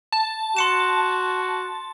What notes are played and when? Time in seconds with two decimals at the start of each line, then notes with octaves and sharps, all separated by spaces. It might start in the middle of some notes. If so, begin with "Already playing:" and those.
0.12 A5
0.57 F#4 C6 C#7 E7